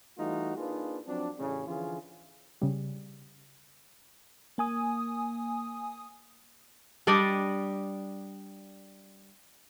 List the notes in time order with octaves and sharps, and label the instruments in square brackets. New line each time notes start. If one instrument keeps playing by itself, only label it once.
[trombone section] E3 G3 A3 D#4 F4 F#4
A#3 D4 D#4 F4 G#4 B4
F3 F#3 C4 D4
A1 C#3
D3 E3 F3 C#4 F4 G#4
[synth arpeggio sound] C#3 G3
[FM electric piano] A#3 G#5 D#6
[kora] G3 D4 D5 D#5